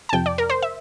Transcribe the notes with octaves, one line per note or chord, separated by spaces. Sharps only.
A5
F2 C3 F3 G5
D5
A#4
C5
E5